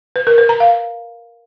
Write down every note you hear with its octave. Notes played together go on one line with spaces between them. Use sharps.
B4
A#4
B4
A#5
F5